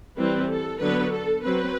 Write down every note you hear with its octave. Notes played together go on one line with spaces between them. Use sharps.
E3 G3 C4 B4
A4
D3 F#3 B3 B4
A4
F#3 C4 B4